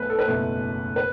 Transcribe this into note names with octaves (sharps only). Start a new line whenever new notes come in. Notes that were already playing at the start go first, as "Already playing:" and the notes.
Already playing: B1 B2 A3 B4
A4
B4
F#1 E2 B2 A3
B4